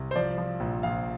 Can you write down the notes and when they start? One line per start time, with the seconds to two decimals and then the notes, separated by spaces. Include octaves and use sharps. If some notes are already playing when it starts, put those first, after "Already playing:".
Already playing: C2
0.11 C5
0.16 F3 D5
0.38 F3
0.60 A#1
0.83 A#1 F5